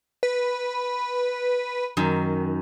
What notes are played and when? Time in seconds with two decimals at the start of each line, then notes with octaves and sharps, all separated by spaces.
0.23 B4
1.97 F#2 D#3